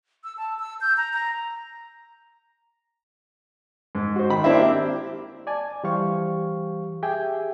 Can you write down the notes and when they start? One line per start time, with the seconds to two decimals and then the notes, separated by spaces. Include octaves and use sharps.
0.24 E6
0.37 A5
0.59 E6
0.81 G6
0.97 A#5
1.13 A#5
3.95 G#2
4.16 F#4 C5
4.29 D#3 B5
4.44 A#3 C4 D4 E4 E5
4.60 G4
5.47 D5 G#5 A5
5.84 E3 G3 G4 C5 F5 C#6
7.03 G4 G#4 E5 G5 G#5